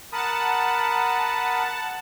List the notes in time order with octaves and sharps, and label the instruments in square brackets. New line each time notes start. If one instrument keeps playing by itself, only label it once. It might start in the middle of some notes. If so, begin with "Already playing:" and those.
[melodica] A#4 B5 D#6 [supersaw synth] F#5 A5